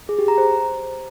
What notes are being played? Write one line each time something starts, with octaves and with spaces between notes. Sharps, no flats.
G#4
G4
A#5
C5